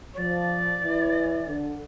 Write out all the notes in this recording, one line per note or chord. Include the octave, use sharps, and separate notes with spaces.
C#5
F3 D5
E3
D3